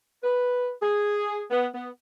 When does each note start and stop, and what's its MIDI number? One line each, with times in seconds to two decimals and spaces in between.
0.24 0.71 71
0.82 1.42 68
1.51 1.66 59
1.74 1.89 59